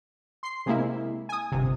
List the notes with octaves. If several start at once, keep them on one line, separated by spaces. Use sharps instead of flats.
C6 C7
C3 G#3 A#3 E4
G#5 D#6
G1 C3